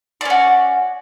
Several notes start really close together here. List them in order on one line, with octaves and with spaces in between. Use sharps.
D5 C#4 F#4